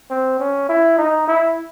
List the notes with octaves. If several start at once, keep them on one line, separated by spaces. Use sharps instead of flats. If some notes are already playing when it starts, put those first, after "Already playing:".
C4
C#4
E4
D#4
E4